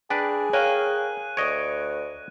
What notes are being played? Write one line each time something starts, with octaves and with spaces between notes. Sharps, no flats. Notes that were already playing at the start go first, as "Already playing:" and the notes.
D4 G#4 B4 D5 G5
A#4 C#5 F5 G5 F#6 D#7
D2 C#5 D#5 D7